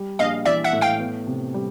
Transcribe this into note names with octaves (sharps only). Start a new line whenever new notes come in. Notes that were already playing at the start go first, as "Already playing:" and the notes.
Already playing: G3
A#1 D#5 F5
E3 D5 E5
E5 F#5
A2
F5 G5
B3
C3
G3